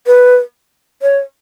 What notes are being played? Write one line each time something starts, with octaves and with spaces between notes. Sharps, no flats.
B4
C#5